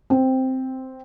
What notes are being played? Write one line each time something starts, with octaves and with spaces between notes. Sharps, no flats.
C4